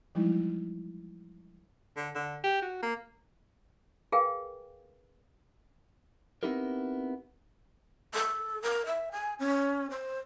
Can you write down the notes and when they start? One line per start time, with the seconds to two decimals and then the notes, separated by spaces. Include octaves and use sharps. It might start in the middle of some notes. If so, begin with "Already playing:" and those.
0.15 E3 F3 G3 G#3 D#4 E4
1.97 D3
2.15 D3
2.43 G4
2.62 F#4
2.82 A#3
4.12 G#4 A#4 B4 F5 G5 G#5
6.43 B3 C4 D#4 E4 G4 A#4
8.15 A4
8.62 A#4
8.86 E5
9.12 G#5
9.39 C#4
9.91 C5